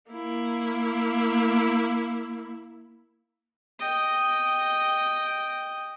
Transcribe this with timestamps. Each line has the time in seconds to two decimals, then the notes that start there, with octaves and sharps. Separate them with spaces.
0.11 A#3 E4
3.80 D#5 G5